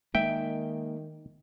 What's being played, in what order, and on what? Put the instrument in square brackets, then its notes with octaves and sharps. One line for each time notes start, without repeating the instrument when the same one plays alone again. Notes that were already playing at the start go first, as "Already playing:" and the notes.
[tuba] D#3 [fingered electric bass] G#3 A#3 [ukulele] E5 [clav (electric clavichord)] G5